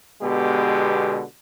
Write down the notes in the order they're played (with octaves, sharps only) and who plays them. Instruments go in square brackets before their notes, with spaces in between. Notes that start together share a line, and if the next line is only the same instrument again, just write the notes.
[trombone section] B2 D3 G#3 B3 G4